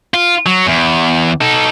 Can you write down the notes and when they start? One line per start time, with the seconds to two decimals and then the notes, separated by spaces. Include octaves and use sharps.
0.14 F4
0.46 F#3
0.66 E2
1.41 D#4 A4